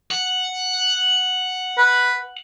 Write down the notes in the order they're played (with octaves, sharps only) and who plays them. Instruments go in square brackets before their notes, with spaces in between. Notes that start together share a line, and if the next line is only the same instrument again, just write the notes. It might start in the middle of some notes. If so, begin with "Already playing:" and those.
[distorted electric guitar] F#5
[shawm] B4